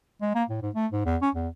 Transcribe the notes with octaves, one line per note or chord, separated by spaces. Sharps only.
G#3
A#3
A2
G#2
A3
G#2
E2
C#4
E2